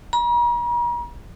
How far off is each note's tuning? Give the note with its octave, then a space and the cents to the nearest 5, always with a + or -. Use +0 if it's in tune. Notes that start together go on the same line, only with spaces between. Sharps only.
A#5 +45